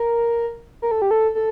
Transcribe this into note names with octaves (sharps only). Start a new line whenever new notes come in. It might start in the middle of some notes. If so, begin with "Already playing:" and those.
Already playing: A#4
A#4
A4
G4
A4
A4